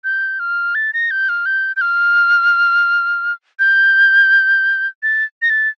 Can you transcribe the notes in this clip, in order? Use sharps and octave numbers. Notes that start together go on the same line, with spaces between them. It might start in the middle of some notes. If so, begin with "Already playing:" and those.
G6
F6
A6
A#6
G6
F6
G6
G6
F6
G6
A6
A#6
A6